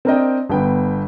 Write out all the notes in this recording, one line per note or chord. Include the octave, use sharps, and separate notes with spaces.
C4 D4 A#4 D5 D#5 G5
G1 B3 G5